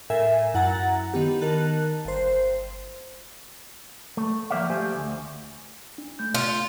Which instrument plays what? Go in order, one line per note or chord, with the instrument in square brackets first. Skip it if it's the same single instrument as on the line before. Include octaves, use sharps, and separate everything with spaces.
[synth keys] A2 A#4 E5 G#5
F#2 E4 F#5 A#5 A6
D#3 B3 G4
D#3 A#4 A5 F#6
G1 C5
[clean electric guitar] A3
F3 A#3 C5 D5 E5 F5
A3 G4 C5 E5 G#5
D2
[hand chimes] D4
A3 G6
[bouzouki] F4